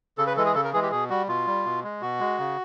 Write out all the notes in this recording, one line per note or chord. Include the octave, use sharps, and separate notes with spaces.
C#3 A4
B4
E3 G#3 A4
G#4
C#3 A4
A#4
E3 G#3 G#4
G4
B2 G#4
G3 F#4
B2 F4
G3
B2
G#3
B2 F#4
G#3
C#3